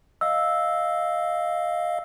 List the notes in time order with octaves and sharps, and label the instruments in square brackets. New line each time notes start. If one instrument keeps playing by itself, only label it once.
[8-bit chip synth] D#5 F5 [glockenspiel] E6